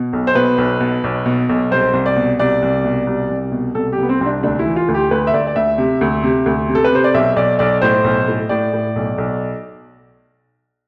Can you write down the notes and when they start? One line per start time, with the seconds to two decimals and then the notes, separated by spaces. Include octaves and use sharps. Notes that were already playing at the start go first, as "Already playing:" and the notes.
Already playing: B2
0.13 B1
0.27 C5
0.35 B2 B4
0.58 B1
0.80 B2
1.04 B1
1.26 B2
1.49 B1
1.71 C2 C5
1.93 C2
2.06 D5
2.16 B2
2.39 C2 D5
2.62 C2
2.85 B2
3.07 C2
3.30 C2
3.52 B2
3.75 C2 A4
3.92 G4
3.98 C2 B3
4.09 C4
4.21 C2 C4
4.26 D4
4.43 D2 D4
4.59 E4
4.66 E3
4.76 F4
4.88 D2
4.94 G4
5.11 D2 B4
5.27 E5
5.34 D2 D5
5.47 D5
5.56 D2 E5
5.78 C3
6.01 D2
6.23 C3
6.46 D2
6.69 C3
6.75 A4
6.84 B4
6.92 C3 C5
7.04 D5
7.14 B1 E5
7.36 B1 D5
7.59 B1 D5
7.82 A2 C5
8.04 B1
8.28 A2
8.49 A2 D5
8.73 A2
8.96 B1
9.18 B1